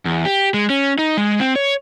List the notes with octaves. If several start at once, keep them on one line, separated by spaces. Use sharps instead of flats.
E2
G4
G#3
C#4
D#4
G#3
C4
C#5